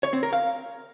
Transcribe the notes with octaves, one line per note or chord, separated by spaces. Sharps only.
C#5
C4
A#4
F5